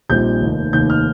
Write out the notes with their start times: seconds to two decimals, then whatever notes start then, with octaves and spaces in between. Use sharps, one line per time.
0.09 A#1 A#2 G3 C4 D#4 G6
0.41 F1 D#2 D#3
0.73 F1 D#2 D#3 G6
0.90 F6